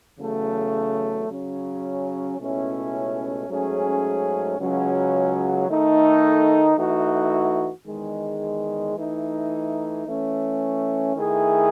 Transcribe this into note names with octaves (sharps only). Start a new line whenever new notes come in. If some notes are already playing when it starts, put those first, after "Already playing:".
E2 C#3 F#3 A3
C#3 F#3 C#4
C#2 B2 A3 C#4 E4
G#2 F#3 A3 C#4 G#4
C#2 C#3 F#3 C#4
D#3 A3 D#4 A4
E3 A3 D#4 F#4
E2 D#3 G#3
E3 A3 D#4
E3 A3 C#4
D#3 A3 E4 G#4